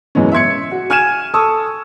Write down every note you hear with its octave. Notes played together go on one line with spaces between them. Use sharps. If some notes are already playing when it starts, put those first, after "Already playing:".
F#2 B2 E3 G#3 C#4
E5 C6 G#6 C#7
F#4
G#5 F6 G#6 D#7 E7
A4 A5 C#6 D#6 E6